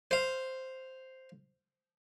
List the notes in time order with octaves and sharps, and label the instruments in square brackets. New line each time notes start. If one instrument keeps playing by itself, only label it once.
[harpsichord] C5 F5